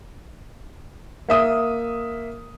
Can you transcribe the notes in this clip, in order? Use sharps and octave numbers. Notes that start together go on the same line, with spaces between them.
A#3 E5 D#6